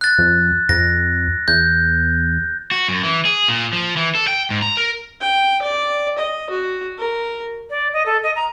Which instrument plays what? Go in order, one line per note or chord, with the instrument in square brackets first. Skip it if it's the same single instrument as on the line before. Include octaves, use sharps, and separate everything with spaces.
[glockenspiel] F#6 A6
[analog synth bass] F2
[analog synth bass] F2 [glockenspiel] A#6
[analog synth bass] E2 [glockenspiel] G6
[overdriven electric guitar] F#4
F#2
E3
G#4
A#2
F3
E3
A4
G5
G#2
A#5
A#4
[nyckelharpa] G5
D5
D#5
F#4
A#4
[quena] D5
D#5
A4
D#5
A#5